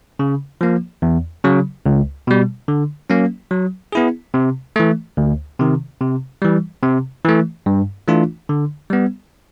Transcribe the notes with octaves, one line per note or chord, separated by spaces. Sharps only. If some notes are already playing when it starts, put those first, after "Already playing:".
C#3
F3 A#3
E2
C#3 F#3
C#2
B2 G3
D3
F#3 A#3 C#4
F#3
B3 E4 G#4
C3
E3 A3
D2
C3 D#3
C3
E3 G3
C3
E3 A3
G2
E3 A3 D4 F4
D3
G3 B3